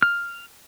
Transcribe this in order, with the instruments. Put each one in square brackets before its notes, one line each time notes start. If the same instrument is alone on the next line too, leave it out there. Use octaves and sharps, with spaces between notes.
[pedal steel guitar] F6